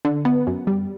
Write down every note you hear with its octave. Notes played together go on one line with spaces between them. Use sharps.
D3
B3
F#2
G3